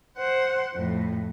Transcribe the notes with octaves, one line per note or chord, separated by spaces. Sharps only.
C5 F#5
F2 A2